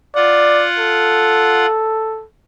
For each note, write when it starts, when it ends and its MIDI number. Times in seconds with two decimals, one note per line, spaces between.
0.15 1.66 65
0.15 0.67 74
0.15 1.66 78
0.78 2.25 69